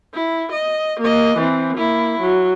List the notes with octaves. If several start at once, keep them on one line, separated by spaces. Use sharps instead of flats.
E4
D#5
A#3 D#5
E3 C4
A#3 E4
F#3